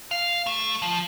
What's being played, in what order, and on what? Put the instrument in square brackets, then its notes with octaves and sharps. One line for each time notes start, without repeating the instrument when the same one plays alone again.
[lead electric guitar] F5
A3
F3